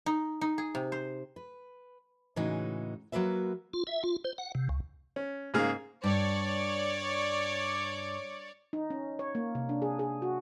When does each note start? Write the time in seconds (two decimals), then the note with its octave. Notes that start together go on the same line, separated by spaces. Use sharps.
0.06 D#4
0.41 D#4
0.58 G#4
0.75 C3
0.92 C5
1.36 B4
2.36 A2 C#3 E3 G#3 D#4 F#4
3.12 F#3 A#3 F#4 B4 E5
3.73 F4
3.87 E5
4.04 F4
4.24 C5
4.38 F#5
4.55 C3
4.69 C#2
5.16 C#4
5.54 G#2 C#3 A#3 G#4 F5 F6
6.04 G2 C#5 D5
8.73 D#4
8.90 C#4
9.19 C#5
9.35 A#3
9.55 C3
9.69 D4
9.82 G#4
9.99 G#4
10.22 F#4